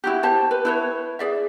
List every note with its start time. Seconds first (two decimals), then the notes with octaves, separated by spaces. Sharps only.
0.04 E4 F#4 G4
0.23 G4 C5 A5
0.51 B4
0.65 E4 B4 C#5
1.19 G#4 D5 E5